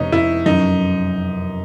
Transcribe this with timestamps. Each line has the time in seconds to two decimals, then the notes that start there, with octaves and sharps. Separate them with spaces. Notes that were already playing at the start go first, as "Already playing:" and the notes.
Already playing: F1 B3 C#4 D#4
0.12 F1 E4
0.46 F#2 D#4